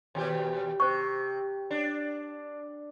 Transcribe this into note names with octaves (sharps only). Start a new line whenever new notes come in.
D#2 B2 G4
C3 C5 C#6
D4